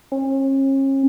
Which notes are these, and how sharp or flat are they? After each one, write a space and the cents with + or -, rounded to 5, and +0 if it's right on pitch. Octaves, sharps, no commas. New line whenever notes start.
C#4 -40